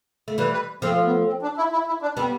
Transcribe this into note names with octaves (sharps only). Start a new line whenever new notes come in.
A3
E3 G3 B4
B4
F3 A3 C4
B3
C4
D4
E4
E4
E4
D4
G3 B3 C4